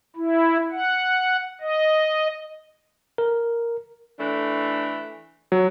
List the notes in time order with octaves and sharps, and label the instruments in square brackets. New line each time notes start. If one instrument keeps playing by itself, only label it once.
[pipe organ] E4
F#5
D#5
[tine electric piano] A#4
[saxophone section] E3 A3 D4
[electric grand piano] F#3